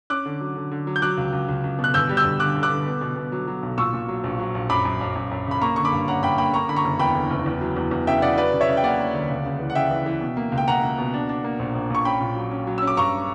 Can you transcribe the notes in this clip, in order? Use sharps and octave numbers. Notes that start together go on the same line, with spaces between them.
C#4 D6 F#6
D3
F#3
D3
D3
F#3
G6
F#3 D6 F#6
C#2
C#2
C#2
C#2
B2
F#6
G1 E6 G6
G3
E6 G6
G1
D3 D6 F#6
D3
D6 F#6
D3
B3
B2
B2
F#3
F#3
B1
A#2 C#6 E6
A#2
F#3
A#1
F#3
A#1
F#2 B5 D6
F#2
F#2
F#2
F#2
C#3 B5
A#3 A#5 C#6
D3 C#6
B5 D6
G2
C#4 F#5 A#5
G2 G5 B5
A#3 G5 B5
A#3 A#5 C#6
D3 B5
A#5 C#6
F#1
E2 G5 B5
D3
F#1
E2
F#3
E2
E2
C#3 E5 G5
C#3 D5 F#5
F#3 B4 D5
C#3
C#5 E5
C#3
G5
A#3 D5 F#5
A#3
D2
C#2
C#3
E3
F#5
C#3 E5 G5
E3
E3
B2
A#3
C#2
G5
C#2 F#5 A#5
C#2
B2
D4
D4
A#3
A#1
A#1
A#1 C#6
C#4 G5 B5
A#2
F#3
C#4
F#3
C#4 E6
D6
G2 A#5 C#6